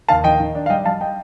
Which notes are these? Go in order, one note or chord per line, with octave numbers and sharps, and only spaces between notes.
D#2 F5 A5
D#3 D#5 G5
D#3
D4
F5
G3 D#5 G5
G3 F5 A5
D#5 G5